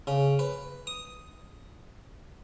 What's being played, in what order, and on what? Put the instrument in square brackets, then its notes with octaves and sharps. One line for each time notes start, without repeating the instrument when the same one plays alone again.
[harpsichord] C#3
B4
D#6